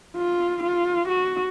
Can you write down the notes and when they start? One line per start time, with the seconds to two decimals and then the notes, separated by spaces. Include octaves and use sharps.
0.16 F4
0.63 F4
1.09 F#4